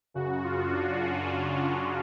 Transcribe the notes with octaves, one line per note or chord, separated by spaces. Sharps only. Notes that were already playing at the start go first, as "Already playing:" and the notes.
F#2 C#3 F#4
F4
D4
C#4